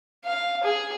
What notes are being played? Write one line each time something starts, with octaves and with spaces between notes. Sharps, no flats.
F5
G#4